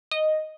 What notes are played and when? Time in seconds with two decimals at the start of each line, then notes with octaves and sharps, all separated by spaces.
0.11 D#5